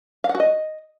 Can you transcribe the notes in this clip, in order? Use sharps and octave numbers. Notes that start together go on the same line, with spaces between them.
F5
F#5
F#4
D#5